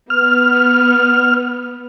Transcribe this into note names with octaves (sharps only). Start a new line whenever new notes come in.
B3 F6